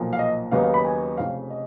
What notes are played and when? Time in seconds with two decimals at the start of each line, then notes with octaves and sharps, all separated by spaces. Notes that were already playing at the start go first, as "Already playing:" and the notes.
Already playing: B1 A#2 F3
0.13 F5
0.19 D#5
0.51 D#2 C#3 F#3 B3 D#4 F5
0.63 F5
0.74 B5
0.85 G#5
1.17 F1 F2 C#3 F5
1.50 D#5